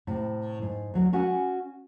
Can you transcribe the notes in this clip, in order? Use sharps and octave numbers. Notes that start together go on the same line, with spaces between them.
A2 C3
G#2
D2 F#3
C#4 F#4 F#5 G#5